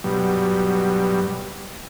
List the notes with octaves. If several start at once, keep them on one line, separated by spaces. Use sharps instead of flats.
G2 B2 F#3 G3